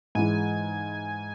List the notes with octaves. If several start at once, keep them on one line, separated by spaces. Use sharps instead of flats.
G#2 E3 G#3 G#5